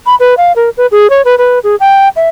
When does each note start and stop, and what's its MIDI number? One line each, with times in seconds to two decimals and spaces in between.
0.06 0.15 83
0.20 0.34 71
0.37 0.52 77
0.56 0.69 70
0.77 0.86 71
0.91 1.10 68
1.10 1.22 73
1.25 1.35 71
1.38 1.59 71
1.64 1.75 68
1.80 2.09 79
2.16 2.29 76